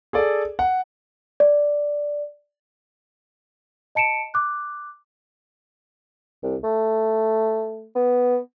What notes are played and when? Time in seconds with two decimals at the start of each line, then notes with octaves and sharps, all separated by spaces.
0.13 G#4 A4 D5
0.59 F#5
1.40 D5
3.95 D#5 A5 C#7 D7 E7
4.34 D6 F#6
6.43 C2
6.64 A3
7.95 B3